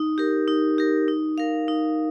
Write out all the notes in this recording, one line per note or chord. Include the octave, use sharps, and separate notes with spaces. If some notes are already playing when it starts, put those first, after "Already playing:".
Already playing: D#4
G4 A#4
D#4
G4 A#4
D#4
A#4 F5
D#4